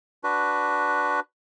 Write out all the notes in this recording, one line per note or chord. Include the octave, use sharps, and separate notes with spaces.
D4 F#4 B4